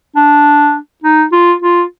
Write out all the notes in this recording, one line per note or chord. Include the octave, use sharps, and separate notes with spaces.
D4
D#4
F4
F4